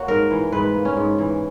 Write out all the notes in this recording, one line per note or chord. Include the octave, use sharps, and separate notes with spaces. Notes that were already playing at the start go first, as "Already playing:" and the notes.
Already playing: A#3 F#4 C#5
G#2 A#4
E3
G#2 B4
A#3
C#4
G#2
E3